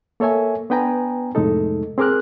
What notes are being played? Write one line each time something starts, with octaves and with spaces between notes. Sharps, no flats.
A#3 A4 C#5 E5 G#5
B3 D4 B4 G5 G#5 A#5
F2 A2 C3 G#3 D#4 A4
C4 G#4 A#4 D6 F6 F#6